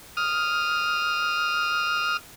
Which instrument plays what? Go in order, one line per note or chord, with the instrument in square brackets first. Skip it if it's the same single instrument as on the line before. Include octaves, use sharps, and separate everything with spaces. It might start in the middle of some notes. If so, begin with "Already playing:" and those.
[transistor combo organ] D#6 F6